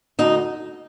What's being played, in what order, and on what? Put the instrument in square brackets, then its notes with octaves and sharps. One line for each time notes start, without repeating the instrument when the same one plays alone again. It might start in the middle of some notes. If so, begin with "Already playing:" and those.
[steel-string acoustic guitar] D2 D#4